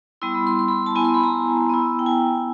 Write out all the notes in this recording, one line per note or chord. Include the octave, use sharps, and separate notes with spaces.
G3 B3 E4 C6
B5
C6
C6
B5
A5
B3 E4 G#5
C6
B5
A#5
B3 E4
G5
G#5